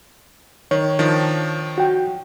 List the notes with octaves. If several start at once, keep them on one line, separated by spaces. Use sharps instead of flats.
D#3 C#5
D#3 F3 D4
F#4 G5